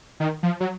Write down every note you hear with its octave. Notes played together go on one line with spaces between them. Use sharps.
D#3
F3
F#3